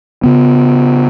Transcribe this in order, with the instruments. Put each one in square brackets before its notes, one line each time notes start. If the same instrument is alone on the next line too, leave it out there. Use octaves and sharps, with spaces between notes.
[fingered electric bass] C#3 B3